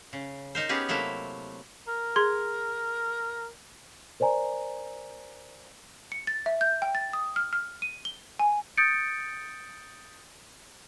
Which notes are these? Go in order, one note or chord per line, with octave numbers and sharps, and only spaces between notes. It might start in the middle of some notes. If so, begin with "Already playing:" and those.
C#3
D#4 A#4 C5
B3 C#4 G4 G#4
C3 F#3 A3 A#3 E4
A#4
G#4 C6 G#6
A#4 C5 D5 G#5 A#5
C#7
A6
E5
G6
G5
A6
D#6
F6
F6
D#7
G7
G#5
D#6 G6 A6 C#7 D7